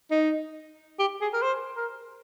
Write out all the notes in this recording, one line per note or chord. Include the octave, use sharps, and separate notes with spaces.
D#4
G4
G#4
A#4
C5
A#4